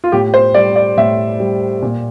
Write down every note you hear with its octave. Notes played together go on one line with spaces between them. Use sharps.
F4
A2 G4
C5
G3 D5
D5
A2 E5
G3
A#2